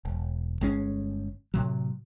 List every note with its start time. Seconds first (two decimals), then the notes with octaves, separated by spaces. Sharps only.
0.05 E1
0.61 G1 G#3 C#4
1.54 A2 C3 F#3